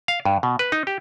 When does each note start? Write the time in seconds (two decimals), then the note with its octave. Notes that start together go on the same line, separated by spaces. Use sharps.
0.08 F5
0.25 G2
0.43 B2
0.59 B4
0.72 D#4
0.87 G4